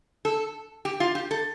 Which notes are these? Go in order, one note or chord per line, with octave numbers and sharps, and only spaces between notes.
A4
G4
F4
G4
A4